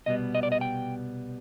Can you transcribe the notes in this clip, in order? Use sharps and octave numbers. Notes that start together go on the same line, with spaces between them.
C2 B2 G3 B3 D#5
D#5
D5
D#5
G5